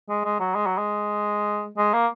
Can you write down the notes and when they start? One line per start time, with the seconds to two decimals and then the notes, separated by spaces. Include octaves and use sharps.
0.09 G#3
0.25 G#3
0.40 F#3
0.55 G#3
0.66 F#3
0.78 G#3
1.77 G#3
1.93 A#3